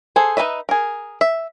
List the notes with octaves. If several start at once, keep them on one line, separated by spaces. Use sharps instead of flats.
G#4 A4 C5
D#4 A#4 B4 D#5 E5
G#4 A#4
E5